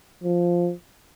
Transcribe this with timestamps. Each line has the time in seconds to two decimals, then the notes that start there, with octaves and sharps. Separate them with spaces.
0.24 F3